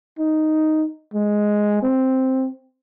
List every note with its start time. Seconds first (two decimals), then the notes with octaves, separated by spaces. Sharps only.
0.19 D#4
1.14 G#3
1.83 C4